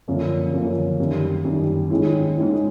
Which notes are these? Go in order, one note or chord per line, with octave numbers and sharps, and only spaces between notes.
F#2 D3 F3 A#3 C#4
F#2 D3 F3 A#3 C#4
F#2 D#3 G3
F#2 D#3 G3
G#2 D#3 G#3 C#4 E4
G#2 D#3 G#3 C#4 E4